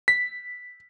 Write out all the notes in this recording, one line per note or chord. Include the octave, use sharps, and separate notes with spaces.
B6